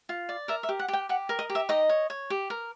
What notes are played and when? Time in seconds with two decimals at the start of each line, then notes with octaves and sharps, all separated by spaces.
0.09 F4
0.29 D5
0.48 A#4 E5
0.63 E5
0.69 G4
0.79 F#5
0.88 G4
0.93 G5
1.09 G4 F#5
1.29 A#4
1.39 D#5
1.50 G4
1.55 E5
1.69 D#4 D#5
1.89 C#5
2.10 C#5
2.30 G4
2.50 A#4